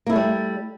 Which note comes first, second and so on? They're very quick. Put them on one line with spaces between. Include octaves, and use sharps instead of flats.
A#3 E4 A3 G3